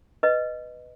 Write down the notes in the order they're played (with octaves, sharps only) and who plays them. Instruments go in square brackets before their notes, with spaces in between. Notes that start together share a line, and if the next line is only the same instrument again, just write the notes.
[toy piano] B4 D#5